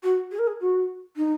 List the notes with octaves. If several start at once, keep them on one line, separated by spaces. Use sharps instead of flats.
F#4
G#4
A#4
G#4
F#4
D#4